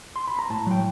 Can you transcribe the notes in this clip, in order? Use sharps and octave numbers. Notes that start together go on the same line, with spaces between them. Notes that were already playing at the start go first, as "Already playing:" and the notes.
C6
B5
A#5
A2 A5
F#3 G5